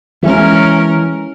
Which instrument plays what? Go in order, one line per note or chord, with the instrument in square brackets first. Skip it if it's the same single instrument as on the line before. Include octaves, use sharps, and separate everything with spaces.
[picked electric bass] E3 G#3 [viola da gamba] C#4 A#4